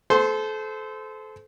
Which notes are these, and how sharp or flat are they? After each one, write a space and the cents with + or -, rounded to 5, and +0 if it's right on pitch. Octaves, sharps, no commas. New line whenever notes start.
A4 -30 C5 -25 C6 +10